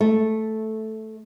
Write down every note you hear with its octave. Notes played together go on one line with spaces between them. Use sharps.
A3